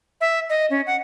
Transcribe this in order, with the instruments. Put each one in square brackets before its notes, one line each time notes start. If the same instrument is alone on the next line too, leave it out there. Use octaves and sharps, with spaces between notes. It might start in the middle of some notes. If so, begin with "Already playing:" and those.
[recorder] E5
D#5
C#4
F#5